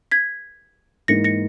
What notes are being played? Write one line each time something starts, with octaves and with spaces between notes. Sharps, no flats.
G#6 B6
G#2 E3 A#3 D#4 A#6 C#7
A#6 C#7